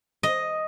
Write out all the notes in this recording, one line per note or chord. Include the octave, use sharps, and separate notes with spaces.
D#5